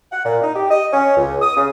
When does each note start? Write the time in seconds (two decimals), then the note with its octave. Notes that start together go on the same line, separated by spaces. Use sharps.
0.12 F#5
0.24 A#2
0.42 D#4
0.55 G4
0.70 D#5
0.92 C#4
1.17 C#2
1.41 D#6
1.56 C#3